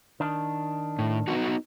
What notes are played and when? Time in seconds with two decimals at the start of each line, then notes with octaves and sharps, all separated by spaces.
0.20 D#3 D4
0.99 A2
1.28 B3 D#4 F#4